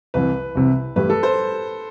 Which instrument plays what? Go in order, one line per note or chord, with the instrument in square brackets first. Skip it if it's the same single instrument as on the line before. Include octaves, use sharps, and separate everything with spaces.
[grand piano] C2 C3 E3 [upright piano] B4
[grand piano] C2 C3 E3
[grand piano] G2 E3 A3 E4 G4 [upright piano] B4
[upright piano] A4
C5